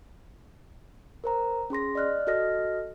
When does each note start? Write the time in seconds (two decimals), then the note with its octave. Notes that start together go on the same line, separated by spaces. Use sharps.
1.24 A#4 C5 A#5
1.70 C#4 G#4 C6 A#6
1.95 D5 D#5 F6 F#6
2.27 F#4 A4 D#5 F6 A#6